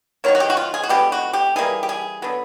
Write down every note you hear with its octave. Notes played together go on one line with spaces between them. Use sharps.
D#3 F#3 A#3 C#5
F#4
G4
F#4
F4
G#4
F#4
D3 F3 G#3 B3 G4
F#4
G4
E3 G3 A#3 G#4
G4
G#4
D3 F#3 B3